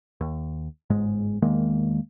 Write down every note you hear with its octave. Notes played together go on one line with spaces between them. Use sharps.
D#2
G1 G#2 G#3
E2 D#3 G#3 A#3